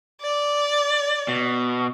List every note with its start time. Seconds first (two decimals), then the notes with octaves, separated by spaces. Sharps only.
0.21 D5
1.28 B2